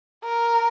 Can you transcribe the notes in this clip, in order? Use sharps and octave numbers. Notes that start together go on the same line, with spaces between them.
A#4